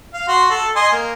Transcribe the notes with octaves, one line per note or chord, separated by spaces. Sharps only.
F5
F#4 C6
A4
D#5 G#5 C6
A#3